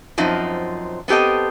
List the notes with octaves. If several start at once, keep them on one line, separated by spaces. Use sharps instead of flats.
F#2 F3 C4 D#4
B3 C4 G4 A4 D#5